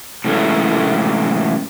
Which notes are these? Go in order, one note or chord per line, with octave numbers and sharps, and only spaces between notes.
A2 C3 E3 G#3 A3 C#4